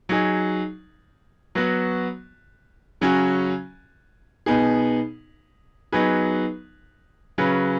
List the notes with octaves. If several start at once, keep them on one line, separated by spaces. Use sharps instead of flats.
F#3 D#4 G#4
F#3 B3 F#4
C#3 F#3 C#4 F#4
B2 B3 D#4 G#4
F#3 B3 D#4 G#4 B4
C#3 F#3 C#4 B4